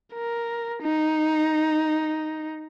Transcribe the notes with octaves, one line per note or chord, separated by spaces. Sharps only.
A#4
D#4